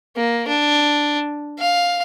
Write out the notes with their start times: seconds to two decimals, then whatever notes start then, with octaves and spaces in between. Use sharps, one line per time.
0.16 A#3
0.48 D4
1.59 F5